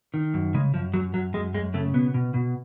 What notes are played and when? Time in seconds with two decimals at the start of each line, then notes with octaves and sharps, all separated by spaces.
0.14 D#3
0.34 F#2
0.54 C#3 G#3
0.74 F#2 F3
0.94 F#2 F#3
1.14 F#2 F#3
1.34 F#2 G#3
1.54 F#2 G#3
1.74 C#3 A3
1.94 B2 B3
2.14 B2
2.34 B2